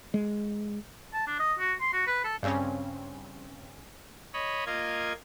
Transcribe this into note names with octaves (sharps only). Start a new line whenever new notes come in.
G#3
A5
D4
D#5
F#4
C6
F#4
B4
A4
G2 C#3 C4 C#4
C#5 D#5 B5
A#3 F4 D#5 G#6